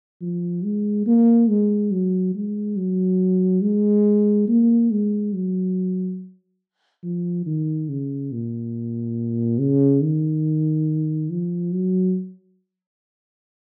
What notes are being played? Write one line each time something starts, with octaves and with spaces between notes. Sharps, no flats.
F3
G#3
A#3
G#3
F#3
G#3
F#3
G#3
A#3
G#3
F#3
F3
D#3
C#3
A#2
C#3
D#3
F3
F#3